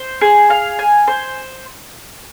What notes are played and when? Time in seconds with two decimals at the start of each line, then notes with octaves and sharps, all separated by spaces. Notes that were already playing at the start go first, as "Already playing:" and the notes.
Already playing: C5
0.21 G#4
0.50 F5
0.79 G#5
1.07 C5